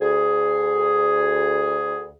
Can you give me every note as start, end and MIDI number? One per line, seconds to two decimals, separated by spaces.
0.01 2.11 38
0.01 2.11 68